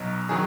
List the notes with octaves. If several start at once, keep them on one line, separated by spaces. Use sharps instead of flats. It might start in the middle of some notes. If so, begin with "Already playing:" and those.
Already playing: B1 B2 F#3
D#3 F#3 G#4